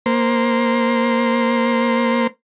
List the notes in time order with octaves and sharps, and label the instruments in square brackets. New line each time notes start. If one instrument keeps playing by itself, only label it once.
[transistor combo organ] A#3 C5